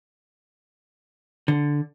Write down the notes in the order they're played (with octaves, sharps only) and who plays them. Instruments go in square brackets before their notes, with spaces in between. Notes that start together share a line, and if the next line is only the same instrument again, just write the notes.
[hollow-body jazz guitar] D3